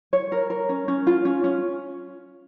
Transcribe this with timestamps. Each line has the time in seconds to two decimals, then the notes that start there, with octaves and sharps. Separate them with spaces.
0.13 C#5
0.32 A#4
0.50 A#4
0.69 C#4
0.88 C#4
1.07 F4
1.25 C#4
1.44 C#4